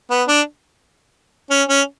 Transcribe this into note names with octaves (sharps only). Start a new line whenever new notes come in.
B3
D4
C#4
C#4